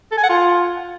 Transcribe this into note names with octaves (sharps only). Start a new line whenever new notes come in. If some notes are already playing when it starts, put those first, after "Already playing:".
A4
G#5
F#5
F4